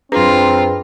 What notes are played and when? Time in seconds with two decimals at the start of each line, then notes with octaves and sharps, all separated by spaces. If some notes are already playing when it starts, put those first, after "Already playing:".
0.12 F#2 C4 D4 F4 G#4 B4 A#5